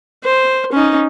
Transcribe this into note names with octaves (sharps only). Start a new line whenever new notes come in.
C5
C#4 D#4